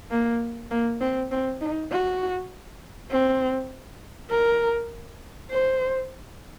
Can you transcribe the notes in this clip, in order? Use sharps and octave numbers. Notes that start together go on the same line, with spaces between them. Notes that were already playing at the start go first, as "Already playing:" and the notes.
A#3
A#3
C4
C4
D#4
F#4
C4
A#4
C5